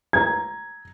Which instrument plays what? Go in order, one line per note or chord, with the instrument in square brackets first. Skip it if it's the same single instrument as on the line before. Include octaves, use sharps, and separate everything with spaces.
[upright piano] A#5 G#6